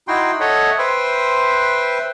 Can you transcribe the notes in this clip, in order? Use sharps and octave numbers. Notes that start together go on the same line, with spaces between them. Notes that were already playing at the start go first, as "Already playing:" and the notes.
D#4 E4 F#4 G5 C6
A4 C#5 D#5 E5 F#5
B4 C5 E5 G5 C6